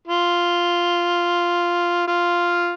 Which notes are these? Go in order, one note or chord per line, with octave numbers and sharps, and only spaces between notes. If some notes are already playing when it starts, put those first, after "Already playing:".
F4
F4